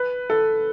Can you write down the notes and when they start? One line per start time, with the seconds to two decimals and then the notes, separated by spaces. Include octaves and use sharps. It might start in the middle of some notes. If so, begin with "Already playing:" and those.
Already playing: B4
0.30 A4